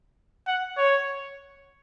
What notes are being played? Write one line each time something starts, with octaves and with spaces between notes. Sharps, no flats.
F#5
C#5